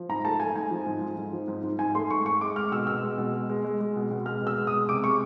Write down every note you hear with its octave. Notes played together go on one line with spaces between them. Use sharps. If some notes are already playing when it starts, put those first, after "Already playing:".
Already playing: F3
G#2 A#5
A3 A5
A3 G#5
G#2 G#5
F3
G#2
G#2
G#2
F3
G#2
G#2
G#2 G#5
A3 C6
G#2 C#6
G#2 C#6
G#3 D6
G#3 F6
B2 E6
B2 E6
G#3
B2
G#3
G#3
G#3
G#3
B2
B2
G#3 F6
B2
E6
G#3
D#6
G#3
C3 D6
G#3 C#6